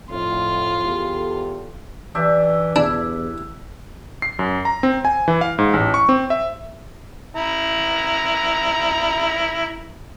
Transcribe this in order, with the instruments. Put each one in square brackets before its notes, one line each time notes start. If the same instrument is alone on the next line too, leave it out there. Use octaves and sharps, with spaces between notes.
[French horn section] F2 A2 [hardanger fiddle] F4
[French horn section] E2 G4 A4
[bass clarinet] E3 [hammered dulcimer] D4 G4 E5
[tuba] E2 [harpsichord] D4 [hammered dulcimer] E4
[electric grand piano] C7
F#2
A#5
C4
G#5
E3
F5
G#2
A1
C#6
C4
E5
[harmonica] E4 A#5